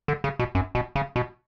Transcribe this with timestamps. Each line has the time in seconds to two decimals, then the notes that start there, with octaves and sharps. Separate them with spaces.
0.08 D3
0.24 C#3
0.39 B2
0.55 F#2
0.75 B2
0.96 C#3
1.16 B2